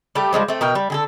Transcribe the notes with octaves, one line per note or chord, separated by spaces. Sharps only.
G3 A3 G4
F3 G3 G#3 C5
A3 C4
B2 A#4 G5
G3
D3 G#4 A4